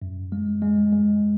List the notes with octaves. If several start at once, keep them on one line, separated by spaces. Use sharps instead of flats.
F#2
G#3
G#3
G#3